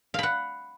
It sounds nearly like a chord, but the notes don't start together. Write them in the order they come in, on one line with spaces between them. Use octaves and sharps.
F5 B5 F#5